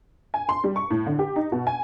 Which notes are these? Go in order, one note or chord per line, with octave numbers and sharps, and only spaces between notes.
G#5
C6
G3
C#6
A2
D3
G4
D#4
B2
G#5